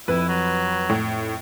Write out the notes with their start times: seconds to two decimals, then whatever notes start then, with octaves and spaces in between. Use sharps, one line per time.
0.08 F2 E4 B4
0.28 F#3
0.89 A2